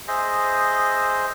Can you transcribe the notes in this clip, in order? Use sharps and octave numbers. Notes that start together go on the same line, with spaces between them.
G#4 C5 D#5 E5